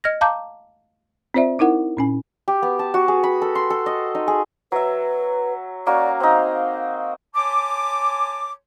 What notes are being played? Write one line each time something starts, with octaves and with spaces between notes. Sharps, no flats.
D#5 F6 G#6 A#6
F5 A5 A#5 D6 G6
C4 F4 C5 D5 E5
D#4 E4 A#4 F#5
A#2 C#4 G#5
G4
B3
A5
F#4
G#4
B5
A4
C6
A4
D#5
D#4
G#4
F#3 B4 E5
A#3 C#4 F#4 D5
C4 D#4 F5
C#5 G#5 A5 C6 D6